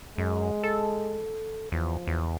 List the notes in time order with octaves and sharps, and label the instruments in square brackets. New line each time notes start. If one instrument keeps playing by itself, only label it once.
[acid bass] F#2 [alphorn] G#3
[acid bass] A4
[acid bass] E2 [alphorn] F3
[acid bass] E2